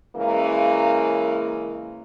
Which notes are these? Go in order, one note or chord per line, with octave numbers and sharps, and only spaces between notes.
C#3 E3 G#3 A#3